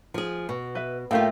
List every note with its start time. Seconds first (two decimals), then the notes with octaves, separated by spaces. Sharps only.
0.14 F3 G#4
0.49 B2
0.75 B4 E5
1.11 A2 A3 A#3 F4 G4 F5 G5